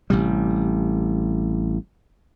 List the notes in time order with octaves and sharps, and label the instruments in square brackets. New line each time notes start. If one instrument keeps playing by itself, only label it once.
[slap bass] A1 C3 G3